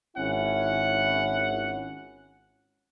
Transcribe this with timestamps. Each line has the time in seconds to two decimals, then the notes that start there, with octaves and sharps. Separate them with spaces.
0.17 G#1 C#4 E4 F#5